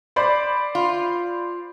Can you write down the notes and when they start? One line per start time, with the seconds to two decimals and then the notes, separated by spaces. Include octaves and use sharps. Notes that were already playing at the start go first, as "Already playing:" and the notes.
0.16 C5 D5 B5
0.75 F4